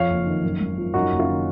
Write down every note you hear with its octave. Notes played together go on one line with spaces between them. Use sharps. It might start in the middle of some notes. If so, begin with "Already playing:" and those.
Already playing: F2 F3 C#5 F5
F#1
D#3
F#2
G#1
F3
F#2 D#4 F#4
F#1
C#4 F4
D#3